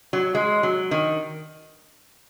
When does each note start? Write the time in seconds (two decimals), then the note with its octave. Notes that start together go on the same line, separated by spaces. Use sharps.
0.13 F#3
0.35 G#3
0.63 F#3
0.91 D#3